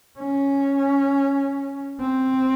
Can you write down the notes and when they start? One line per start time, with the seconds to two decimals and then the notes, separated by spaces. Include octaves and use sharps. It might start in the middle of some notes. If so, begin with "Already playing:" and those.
0.19 C#4
2.01 C4